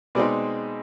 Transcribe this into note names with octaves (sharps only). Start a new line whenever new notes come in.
B2 G#3 C4 D#4 B4 D5